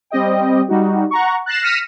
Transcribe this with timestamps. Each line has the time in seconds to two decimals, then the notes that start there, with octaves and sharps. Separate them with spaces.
0.10 G3 C4 G4 D#5 G5
0.68 G3 D#4 F#4
1.11 F#5 A#5 C#6
1.46 F#6 A6 A#6 C7 E7
1.63 F6 A#6 B6 C#7 D#7 E7